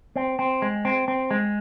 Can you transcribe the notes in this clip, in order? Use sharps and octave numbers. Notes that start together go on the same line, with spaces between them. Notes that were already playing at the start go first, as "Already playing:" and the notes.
C4
C4
G#3
C4
C4
G#3